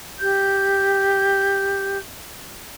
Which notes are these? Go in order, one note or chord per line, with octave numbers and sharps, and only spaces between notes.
G4 G6